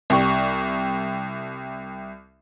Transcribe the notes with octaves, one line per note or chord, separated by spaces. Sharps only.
C2 G4 C#6